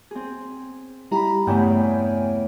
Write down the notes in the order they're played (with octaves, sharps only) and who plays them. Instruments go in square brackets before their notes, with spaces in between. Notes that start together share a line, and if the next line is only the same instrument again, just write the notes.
[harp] C4 G#4
[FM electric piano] G3 E4 G4 [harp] A#5 B5
[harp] E2 C#3 A3 [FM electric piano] G2 G5 G#5